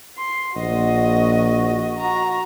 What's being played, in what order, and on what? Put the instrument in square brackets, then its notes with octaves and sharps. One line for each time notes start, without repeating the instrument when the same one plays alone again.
[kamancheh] C6
[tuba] A#1 [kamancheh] F#4 D#5
[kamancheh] F#4 A#5